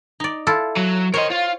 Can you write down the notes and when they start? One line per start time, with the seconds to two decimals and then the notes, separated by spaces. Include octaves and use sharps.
0.20 D#4 D5
0.47 E4 F4 A4
0.76 F#3
1.14 A#4 C5 C#5 D#5
1.30 F4